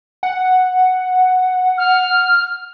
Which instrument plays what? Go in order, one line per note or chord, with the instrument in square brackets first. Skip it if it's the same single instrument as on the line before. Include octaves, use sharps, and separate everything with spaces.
[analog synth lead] F#5
[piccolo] F6